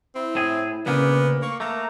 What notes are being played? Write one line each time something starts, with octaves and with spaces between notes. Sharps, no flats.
C4 E4
A2 G#4
D2 A#2 C#3 A#3 B3
A#3 C#6
A3 A#3 A#5